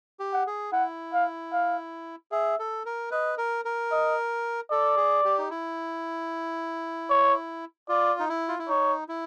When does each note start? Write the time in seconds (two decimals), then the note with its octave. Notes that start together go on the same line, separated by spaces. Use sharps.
0.20 G4
0.33 F#5
0.47 G#4
0.72 E4 F#5
1.13 F5
1.53 F5
2.32 G#4 E5
2.59 A4
2.86 A#4
3.11 B4 D#5
3.38 A#4
3.65 A#4
3.91 D#5
4.71 A4 D5
4.97 G#4
5.24 G4
5.38 D#4
5.50 E4
7.10 C#5
7.89 F4 D5
8.19 D#4
8.29 E4
8.49 F4
8.59 E4
8.68 D#4 C#5
9.09 E4